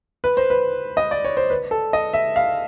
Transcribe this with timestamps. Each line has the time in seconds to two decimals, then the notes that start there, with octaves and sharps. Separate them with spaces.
0.24 B4
0.37 C5
0.50 B4
0.97 D#5
1.11 D5
1.25 C#5
1.37 C5
1.50 B4
1.71 A4
1.93 D#5
2.13 E5
2.36 F5